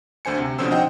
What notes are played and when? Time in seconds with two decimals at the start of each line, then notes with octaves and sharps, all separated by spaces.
0.25 D2 D3 C5 G#5 C#7
0.38 C3
0.58 B2 D3 F3 C#4 C5 E6
0.71 D#4 C5 D#5 F#5 G5